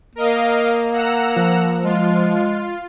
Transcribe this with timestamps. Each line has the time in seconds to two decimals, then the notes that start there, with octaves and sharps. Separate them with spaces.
0.16 A#3 A#4 D#5 F5
0.93 F#5 A#5 E6
1.36 F3
1.84 G#3 F4